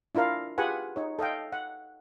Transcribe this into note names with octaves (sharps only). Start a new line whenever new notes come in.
D4 E4 F4 A#4 F5
F4 G4 G#4 B4 F#5 G#5
D#4 C#5
A4 D#5 F5 G5
F#5